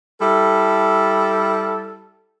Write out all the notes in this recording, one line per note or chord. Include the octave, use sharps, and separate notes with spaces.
G3 E4 A4